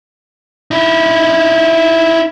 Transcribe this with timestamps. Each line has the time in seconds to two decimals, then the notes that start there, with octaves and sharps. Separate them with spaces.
0.71 D#4 E4